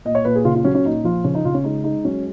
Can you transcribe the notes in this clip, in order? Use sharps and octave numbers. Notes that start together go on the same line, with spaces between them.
A#2 D#5
C#5
A#2 B4
G#4
C#3 F4
F4
F#3 C#4
C#4
A#2 D#4
F3 F4
C#3 C#4
D#4
C#3 F4
C#4
G#3 D#4
G#3 D#4
F#3 C#4